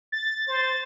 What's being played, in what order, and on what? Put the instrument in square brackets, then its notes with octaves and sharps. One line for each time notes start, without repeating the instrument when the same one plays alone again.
[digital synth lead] A6
[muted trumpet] C5